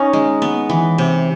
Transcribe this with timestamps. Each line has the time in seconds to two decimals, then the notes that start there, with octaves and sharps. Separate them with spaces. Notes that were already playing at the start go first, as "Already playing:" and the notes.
Already playing: C#4 D#4
0.13 G#3
0.42 B3
0.70 E3
0.98 C3